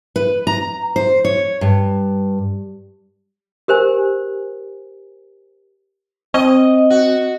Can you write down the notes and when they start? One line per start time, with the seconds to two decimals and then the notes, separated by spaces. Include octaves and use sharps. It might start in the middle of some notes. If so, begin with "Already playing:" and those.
0.16 B4
0.47 A#5
0.96 C5
1.25 C#5
1.61 G2
3.68 G4 A#4 C5 G#5
6.34 C4 D#5
6.90 F#4